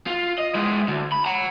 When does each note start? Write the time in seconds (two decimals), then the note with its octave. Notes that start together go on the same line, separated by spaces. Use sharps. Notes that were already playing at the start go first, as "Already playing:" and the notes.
0.07 F4
0.38 D#5
0.55 G#3 E4
0.88 D2
1.12 B5
1.25 F#5 A#5